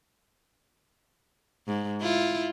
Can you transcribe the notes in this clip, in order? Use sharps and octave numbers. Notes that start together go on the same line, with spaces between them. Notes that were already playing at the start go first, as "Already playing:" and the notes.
G#2
E4 F4